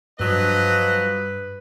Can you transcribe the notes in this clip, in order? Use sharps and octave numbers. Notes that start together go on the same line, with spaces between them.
G2 F3 F#3 B4 D#5